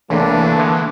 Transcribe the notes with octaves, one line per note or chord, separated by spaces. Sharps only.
C#2 C3 E3 A3 A#3 D4
D3 G#3